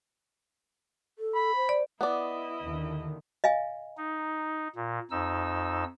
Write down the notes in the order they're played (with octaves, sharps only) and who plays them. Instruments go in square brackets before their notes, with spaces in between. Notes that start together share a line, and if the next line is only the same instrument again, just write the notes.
[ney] A4
[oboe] B5
[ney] C5
[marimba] D5
[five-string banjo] B3 D5 [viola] E4 D#5
[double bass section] D#2 D3 D#3
[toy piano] D#5 F5 G#5
[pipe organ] D#4
A#2
F2 D#4 E6